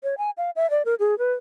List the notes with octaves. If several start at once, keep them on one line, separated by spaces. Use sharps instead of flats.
C#5
G#5
F5
E5
D5
A#4
G#4
B4